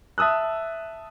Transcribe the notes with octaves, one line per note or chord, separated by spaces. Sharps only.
E5 A5 D#6 E6 F#6